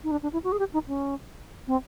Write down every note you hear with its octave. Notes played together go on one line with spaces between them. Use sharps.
D#4
D4
D4
E4
F#4
G#4
G4
D#4
C#4
C4